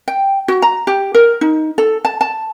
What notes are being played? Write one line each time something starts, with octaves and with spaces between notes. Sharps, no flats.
G5
F#4
A#5
G4
A#4
D#4
A4
A5
A5